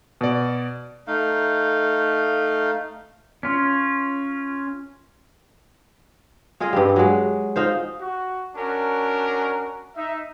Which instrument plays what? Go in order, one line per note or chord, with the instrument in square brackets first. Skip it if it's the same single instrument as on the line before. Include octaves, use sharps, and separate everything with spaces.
[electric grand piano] B2 D5
[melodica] A3 D#4 F5
[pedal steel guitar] C#4 F4
[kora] G#3 F4 G#4 D#5
G2 G3
F#3 G#3
D#4 F4 C5
[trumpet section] F#4
C#4 D4 F#4 A#4
D#4 E5